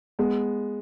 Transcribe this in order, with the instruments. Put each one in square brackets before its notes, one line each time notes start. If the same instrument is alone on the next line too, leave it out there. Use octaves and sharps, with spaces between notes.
[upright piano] G#3 B3